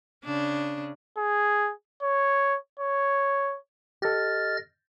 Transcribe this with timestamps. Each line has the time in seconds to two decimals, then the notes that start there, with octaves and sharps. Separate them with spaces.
0.25 C#3 D4
1.17 G#4
2.02 C#5
2.79 C#5
4.02 G4 A4 D#5 F6 A6